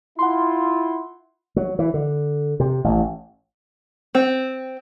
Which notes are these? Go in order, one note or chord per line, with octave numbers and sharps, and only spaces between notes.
E4 F4 F#5 C6
F#3
E3
D3
C3
A1
C4